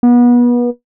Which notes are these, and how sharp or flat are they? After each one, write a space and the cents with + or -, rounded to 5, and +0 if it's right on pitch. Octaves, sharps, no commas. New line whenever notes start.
B3 -30